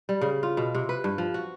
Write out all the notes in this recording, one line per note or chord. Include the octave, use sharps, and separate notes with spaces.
G3
C#3
F4
B2
C3
B4
G2
F3
F#4